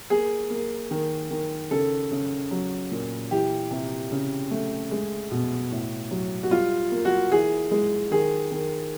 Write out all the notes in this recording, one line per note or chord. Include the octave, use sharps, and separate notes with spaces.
A#3 G#4
A#3
D#3
D#3
C#3 A4
C#3
F#3
A#2
E3 G4
C3
C#3
A3
G#3
B2
A2
F#3
F#4
G3 F4
A#3
F#4
E3 G#4
G#3
D#3 G#4
D#3